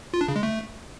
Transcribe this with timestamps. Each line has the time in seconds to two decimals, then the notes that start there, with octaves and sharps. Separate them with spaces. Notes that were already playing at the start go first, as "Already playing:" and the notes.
0.14 F4
0.21 D4
0.28 C#3
0.36 G#3
0.43 A3